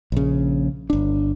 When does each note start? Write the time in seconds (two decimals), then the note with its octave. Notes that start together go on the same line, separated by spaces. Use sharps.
0.12 A#1 C#3
0.90 G1 D4